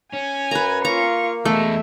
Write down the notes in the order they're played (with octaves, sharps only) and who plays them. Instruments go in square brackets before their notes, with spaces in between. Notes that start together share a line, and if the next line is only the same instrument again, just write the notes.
[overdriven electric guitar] C#4 [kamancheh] G#5
[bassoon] F#2 [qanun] B4 A#5
[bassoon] A#3 [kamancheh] F4 C#6 [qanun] A#5
[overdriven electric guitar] E2 G#3 [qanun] A3 [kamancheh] E5